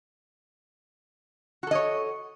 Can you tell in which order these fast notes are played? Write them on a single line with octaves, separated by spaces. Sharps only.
F#4 A4 D#5 C#5